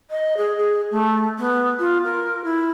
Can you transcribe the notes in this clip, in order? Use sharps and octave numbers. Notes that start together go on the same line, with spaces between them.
D#5
G#4
G#4
A3
B3
F4
A#4
E4